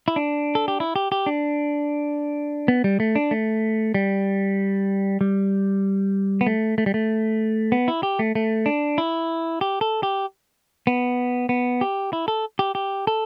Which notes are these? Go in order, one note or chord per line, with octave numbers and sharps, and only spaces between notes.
E4
D4
A4
G4
E4
G4
G4
D4
B3
G3
A3
D4
A3
G3
G3
B3
A3
A3
G3
A3
B3
E4
G4
A3
A3
D4
E4
G4
A4
G4
B3
B3
G4
E4
A4
G4
G4
A4